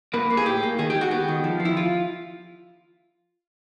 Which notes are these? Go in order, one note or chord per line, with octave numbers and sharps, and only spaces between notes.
A#3 B4
A#3
G#4
A2 G4
A#3
D#3 G#4
G4
G#3
F#4
B3 G4
D#3
F3
F3
E4
F3 F4